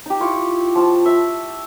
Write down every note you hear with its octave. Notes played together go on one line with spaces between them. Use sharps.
D#4 G4
E4 F4 C#6 D6
F3 F4 A5
E5